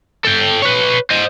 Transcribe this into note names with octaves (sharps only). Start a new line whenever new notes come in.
A4 G5
B4 C#5
C5 D#5